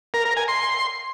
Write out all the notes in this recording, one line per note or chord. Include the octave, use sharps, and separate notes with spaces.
A#4
A#4
G#5
C6